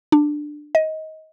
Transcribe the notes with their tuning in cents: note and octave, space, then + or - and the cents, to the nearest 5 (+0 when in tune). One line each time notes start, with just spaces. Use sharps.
D4 +15
D#5 +20